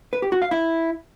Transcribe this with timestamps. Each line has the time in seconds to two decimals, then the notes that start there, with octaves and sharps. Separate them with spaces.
0.13 B4
0.22 G4
0.32 F#4
0.42 F5
0.51 E4